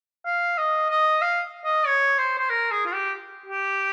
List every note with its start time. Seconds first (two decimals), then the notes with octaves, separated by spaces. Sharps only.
0.25 F5
0.58 D#5
0.90 D#5
1.22 F5
1.65 D#5
1.86 C#5
2.18 C5
2.38 C5
2.50 A#4
2.71 G#4
2.86 F4
2.93 G4
3.46 G4